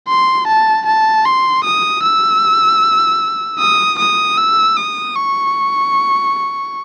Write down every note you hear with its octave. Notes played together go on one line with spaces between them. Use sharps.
C6
A5
A5
C6
D#6
E6
D#6
D#6
E6
D#6
C#6